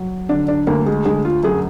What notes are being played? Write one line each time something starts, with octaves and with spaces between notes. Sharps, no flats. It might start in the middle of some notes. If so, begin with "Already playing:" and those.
Already playing: F#3
D3 D4
D4
D2 A#3
G#3
D2 G#3
F4
F#2 G#4